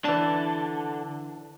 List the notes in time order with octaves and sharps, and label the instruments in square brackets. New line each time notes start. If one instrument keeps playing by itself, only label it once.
[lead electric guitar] D3 A5 [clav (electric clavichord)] E3 D4